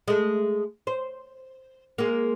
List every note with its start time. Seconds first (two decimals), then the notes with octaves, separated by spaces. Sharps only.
0.08 G#3 A3
0.87 C5
1.98 G#3 A#3